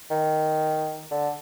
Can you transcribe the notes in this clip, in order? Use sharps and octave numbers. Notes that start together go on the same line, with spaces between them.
D#3
D3